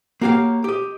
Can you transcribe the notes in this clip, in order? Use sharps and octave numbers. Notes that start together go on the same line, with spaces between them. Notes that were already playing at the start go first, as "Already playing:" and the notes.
A#3 F#4 G4 C#5 F5
G4 D#5